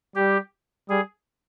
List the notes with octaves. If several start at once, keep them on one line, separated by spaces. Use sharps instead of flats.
G3 G4
G3 G#4